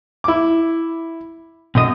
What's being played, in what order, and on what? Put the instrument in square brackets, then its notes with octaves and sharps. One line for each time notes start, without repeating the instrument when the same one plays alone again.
[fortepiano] E4 D6
[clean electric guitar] B1 D#5 [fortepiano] F#2